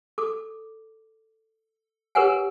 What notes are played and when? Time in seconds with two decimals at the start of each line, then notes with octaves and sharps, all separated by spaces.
0.18 A4 D6
2.15 G4 A#4 B4 C#5 F#5 G#5